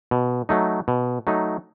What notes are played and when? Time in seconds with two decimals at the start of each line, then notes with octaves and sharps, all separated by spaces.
0.11 B2
0.49 F#3 A3 D#4
0.88 B2
1.27 F#3 A3 D#4